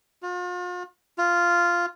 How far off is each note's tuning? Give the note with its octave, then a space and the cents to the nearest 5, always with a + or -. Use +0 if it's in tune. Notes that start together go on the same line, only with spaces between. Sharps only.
F4 +40
F4 -5